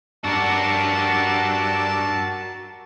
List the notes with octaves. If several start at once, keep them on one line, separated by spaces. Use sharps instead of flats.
G2 D4 F#4 A#4 A5 E6